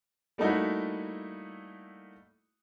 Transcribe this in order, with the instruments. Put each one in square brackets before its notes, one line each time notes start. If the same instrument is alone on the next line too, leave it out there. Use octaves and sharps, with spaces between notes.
[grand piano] G3 A3 A#3 D#4 E4 F#4